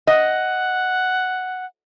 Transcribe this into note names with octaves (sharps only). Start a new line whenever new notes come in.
D#5 F#5